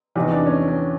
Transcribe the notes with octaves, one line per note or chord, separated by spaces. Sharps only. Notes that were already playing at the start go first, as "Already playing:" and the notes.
E2 C3 E3 D#4
D4
C#4
C#4